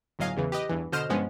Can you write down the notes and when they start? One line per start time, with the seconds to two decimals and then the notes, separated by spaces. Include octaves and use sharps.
0.19 G1 A2 F#3 D#5 F5 G#5
0.37 E2 C#3 E3
0.52 G4 B4 D#5
0.69 E2 G2 E3
0.92 B2 D3 C5 D#5 F6 E7
1.09 G2 F3 G#3 B3 C#4